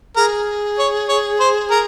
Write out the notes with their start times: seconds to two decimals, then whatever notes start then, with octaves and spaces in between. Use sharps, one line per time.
0.16 G#4 A#4
0.79 C#5
1.09 C#5
1.40 C5
1.71 A#4